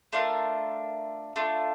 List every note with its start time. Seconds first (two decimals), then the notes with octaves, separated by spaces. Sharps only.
0.13 A3 D4 F4 A#4
1.36 A3 D4 F4